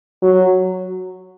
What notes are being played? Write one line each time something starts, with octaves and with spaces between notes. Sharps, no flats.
F#3